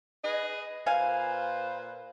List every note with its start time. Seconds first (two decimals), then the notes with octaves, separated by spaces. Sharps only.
0.25 G#4 B4 D#5
0.86 A#2 B4 C5 F5 G#5